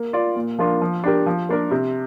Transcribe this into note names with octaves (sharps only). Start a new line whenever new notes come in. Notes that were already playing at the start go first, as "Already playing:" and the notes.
Already playing: A#3
F4 D5
A#2
F3 A#3 D4 F4
F3
D4 G4 A#4
F3
A#3 D4 A#4
C3